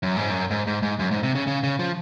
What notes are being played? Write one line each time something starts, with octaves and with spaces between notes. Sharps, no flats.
F#2
G#2
F#2
G#2
G#2
G#2
F#2
G#2
C3
C#3
C#3
C#3
F3